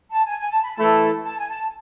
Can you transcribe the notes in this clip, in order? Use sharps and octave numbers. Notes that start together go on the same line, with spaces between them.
A5
G#5
G#5
A5
B5
E3 A3 E4 A5
A5
G#5
A5